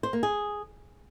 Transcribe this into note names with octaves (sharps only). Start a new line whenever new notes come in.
C5
A#3
G#4